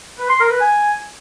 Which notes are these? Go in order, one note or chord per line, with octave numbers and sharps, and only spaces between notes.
B4
C6
A#4
B4
G#5